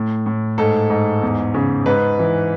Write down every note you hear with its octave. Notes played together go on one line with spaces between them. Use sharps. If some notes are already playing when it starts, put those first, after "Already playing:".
Already playing: A2
A2
G#2 A4
G#2
E2
C#3
G#2 B4
E3